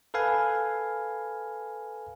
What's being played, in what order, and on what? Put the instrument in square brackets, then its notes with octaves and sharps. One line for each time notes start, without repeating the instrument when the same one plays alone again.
[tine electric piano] A4 B4 F5 G#5